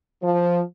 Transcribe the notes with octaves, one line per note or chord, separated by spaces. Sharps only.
F3